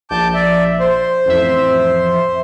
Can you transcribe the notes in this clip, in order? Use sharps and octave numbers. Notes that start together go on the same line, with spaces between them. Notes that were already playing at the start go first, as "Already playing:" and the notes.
A#1 A5 D6 G6
D5 E5
C5
A1 F2 E5